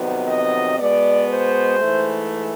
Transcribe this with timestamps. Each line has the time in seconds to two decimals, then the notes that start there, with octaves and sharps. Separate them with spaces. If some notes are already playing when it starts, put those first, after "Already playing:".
Already playing: F2 C3 D#3 F#3 B3
0.27 D#5
0.78 B2 G#3 B3 D5
1.29 C5
1.80 G#2 E3 A3